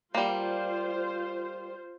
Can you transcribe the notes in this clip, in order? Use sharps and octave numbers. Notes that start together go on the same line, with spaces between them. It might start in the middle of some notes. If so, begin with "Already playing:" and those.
G3 A#3 F4 C5